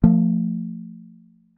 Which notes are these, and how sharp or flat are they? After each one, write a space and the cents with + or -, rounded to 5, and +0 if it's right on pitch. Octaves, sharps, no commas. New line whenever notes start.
F3 +0 A3 +30